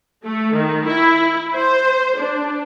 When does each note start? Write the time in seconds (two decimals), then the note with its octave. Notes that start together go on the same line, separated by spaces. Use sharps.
0.25 A3
0.55 D#3
0.88 E4
1.54 C5
2.18 D4